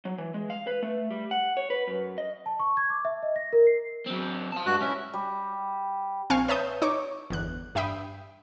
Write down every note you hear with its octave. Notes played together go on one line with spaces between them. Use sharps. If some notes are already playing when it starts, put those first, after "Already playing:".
F#3
E3
G#3
F5
B4
A3
G3
F#5
C#5
B4
F#2
D#5
A5
C#6
G#6
D6
E5
D#5
A#6
A#4
C7
F#3 C4
F5 A5
G2 G#3 F#4 F#6
C#4 E4
G3
A#1 C4 F5 G#5 C#6 F6
B4 C#5 E5 A5 D#6 G6
D#4 C#5 C#6 D6
G1 E2 F#6
G2 E5 G5 B5 D#6